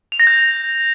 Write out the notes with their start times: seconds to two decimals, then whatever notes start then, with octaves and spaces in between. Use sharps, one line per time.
0.12 F7
0.20 A#6
0.27 G6